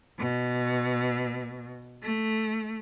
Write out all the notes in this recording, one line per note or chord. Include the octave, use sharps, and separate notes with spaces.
B2
A3